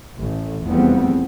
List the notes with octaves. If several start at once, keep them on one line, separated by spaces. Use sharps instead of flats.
A1
F1 E2 F3 G3 B3 C4